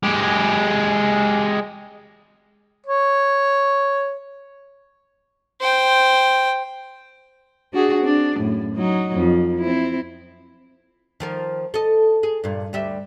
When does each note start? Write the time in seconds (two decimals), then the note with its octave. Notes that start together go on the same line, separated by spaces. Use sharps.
0.03 G#3 G4
2.87 C#5
5.61 C5 G5
7.73 D4 F#4 G#4
8.01 C4 D4
8.38 F#2 A2
8.75 F#3 D#4
9.14 F2
9.59 C4 E4
11.20 D#3 F3 A#4
11.74 A4 D#5
12.23 G#4
12.44 G2 A#2
12.73 D2 G3 E5